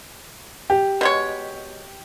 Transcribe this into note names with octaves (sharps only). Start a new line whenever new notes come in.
G4
B2 G#3 C#5